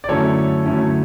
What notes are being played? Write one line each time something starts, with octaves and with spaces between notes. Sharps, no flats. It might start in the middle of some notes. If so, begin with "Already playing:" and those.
D5
F#2 D3 A3 C#4 E4 A4 C#5
F#2 D3 A3 C#4 E4